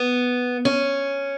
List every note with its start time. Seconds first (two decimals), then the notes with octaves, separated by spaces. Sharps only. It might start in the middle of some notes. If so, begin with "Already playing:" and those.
Already playing: B3
0.65 C#4